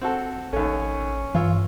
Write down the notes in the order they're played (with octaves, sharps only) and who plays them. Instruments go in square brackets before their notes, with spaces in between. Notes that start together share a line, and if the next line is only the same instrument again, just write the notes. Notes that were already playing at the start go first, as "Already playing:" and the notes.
[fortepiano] C4 F#4 A4
[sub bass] A1 [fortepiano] D#2 A3 [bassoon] C#4
[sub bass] G2 [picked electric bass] E3 [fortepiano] F4 C#5 E6